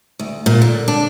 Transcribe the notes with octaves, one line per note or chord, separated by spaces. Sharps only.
D2
A#2
D3
D4